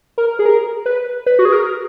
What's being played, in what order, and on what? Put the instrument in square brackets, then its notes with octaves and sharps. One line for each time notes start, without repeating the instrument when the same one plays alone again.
[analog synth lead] A#4
G#4
A#4
B4
B4
F#4
G#4
A#4